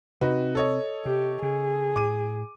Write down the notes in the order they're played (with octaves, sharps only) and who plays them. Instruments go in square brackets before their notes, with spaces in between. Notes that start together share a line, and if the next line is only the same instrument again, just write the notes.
[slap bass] C3 C4 [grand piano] D#4 F#4 B4
[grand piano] A4 C#5 D#5
[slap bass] C3 [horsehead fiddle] G4
[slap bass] C#3 [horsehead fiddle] G#4
[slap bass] A2 [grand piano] D6 D#7